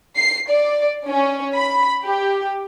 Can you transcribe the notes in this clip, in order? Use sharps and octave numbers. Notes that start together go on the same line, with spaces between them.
C7
D5
C#4
B5
G4